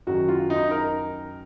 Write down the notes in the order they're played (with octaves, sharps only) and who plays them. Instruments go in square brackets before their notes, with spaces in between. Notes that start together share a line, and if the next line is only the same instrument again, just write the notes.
[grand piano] F#2 D#3 F#4
F4
D#4
A#4